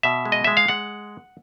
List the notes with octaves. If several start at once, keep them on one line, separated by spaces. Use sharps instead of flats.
B2 E5
G#3
D#5
G#3 E5
F5
G#3 F#5